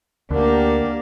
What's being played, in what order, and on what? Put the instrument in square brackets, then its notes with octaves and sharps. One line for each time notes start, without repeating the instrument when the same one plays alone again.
[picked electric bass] D2 [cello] A#3 D4 [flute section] G4 A#4 F#5